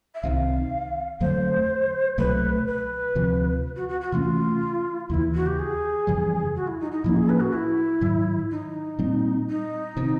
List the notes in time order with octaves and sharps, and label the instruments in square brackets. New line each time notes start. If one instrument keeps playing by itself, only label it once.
[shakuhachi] E5
[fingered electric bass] C2 C3 D#3 [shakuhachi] F5
[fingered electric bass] F2 D3 F#3 A3 [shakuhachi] C5
[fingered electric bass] C2 B2 F#3 A3 [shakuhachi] B4
[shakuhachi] B4
[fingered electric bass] D2 C3 F3
[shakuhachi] F#4
F#4
F#4
[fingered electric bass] C3 E3 A3 C#4 [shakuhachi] F4
[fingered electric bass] D#2 C#3 E3 [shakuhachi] E4
[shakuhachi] F#4
G4
G#4
[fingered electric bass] F2 C#3 E3 G3
[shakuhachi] F#4
E4
D#4
D#4
[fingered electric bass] A2 F3 A#3 C#4 [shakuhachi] E4
[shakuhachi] G#4
B4
F#4
E4
[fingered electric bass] G#2 D#3 F#3
[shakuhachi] D#4
[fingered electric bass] A#2 G3 C4
[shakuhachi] D#4
[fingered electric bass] C3 D#3